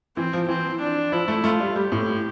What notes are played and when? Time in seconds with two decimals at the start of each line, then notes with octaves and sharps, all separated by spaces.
0.17 E3 C4
0.33 F3
0.48 E3 C4
0.81 D4
1.12 F3 E4
1.28 A3
1.44 A3 F4
1.60 G3
1.76 G3 G4
1.92 A2